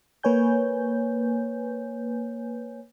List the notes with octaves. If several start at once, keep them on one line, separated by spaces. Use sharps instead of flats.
A#3 B4 C#5 G#5 G6